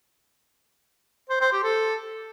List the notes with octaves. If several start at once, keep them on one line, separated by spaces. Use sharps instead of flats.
C5
C5
G4
A4